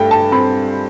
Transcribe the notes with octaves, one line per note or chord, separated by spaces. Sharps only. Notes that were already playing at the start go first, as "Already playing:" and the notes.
Already playing: G2 A3 G5
A5
C4 B5